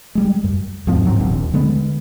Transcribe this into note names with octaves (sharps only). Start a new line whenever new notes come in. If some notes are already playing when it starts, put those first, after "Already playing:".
G3 G#3
F#2
E2 G#2 F3 C4
G#2 F#3 G3 C4
D#1 A#1 D#2
D3 G#3 B3